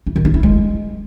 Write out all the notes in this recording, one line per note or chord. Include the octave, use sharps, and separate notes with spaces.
E4
D#3
D#4
E4
G#3